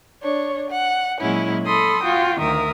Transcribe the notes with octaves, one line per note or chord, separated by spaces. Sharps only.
D4 C#5
F#5
A#2 F#3 G#3 C#4 E4
A4 B5 C6 D#6
F4 F#4 G5
D2 D#3 A#4 E5 D#6